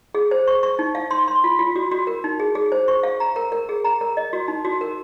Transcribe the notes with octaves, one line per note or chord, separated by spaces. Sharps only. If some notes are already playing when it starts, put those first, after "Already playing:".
G#4
C5
C#6
C#6
D#4
F5
C6
C6
F4
F4
F#4
F#4
A#4
D#4
G#4
G#4
C5
C#6
F5
A#5
A#4
A#4
G#4
A#5
A#4
D#5
F#4
D#4
F#4
A#4